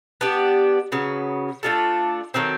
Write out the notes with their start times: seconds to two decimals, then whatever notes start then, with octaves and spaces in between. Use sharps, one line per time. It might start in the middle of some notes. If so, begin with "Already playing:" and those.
0.21 B3 D4 G4
0.92 C#3 F#3 B3
1.63 A3 D4 F4 A4
2.34 D#3 F#3 A3 C4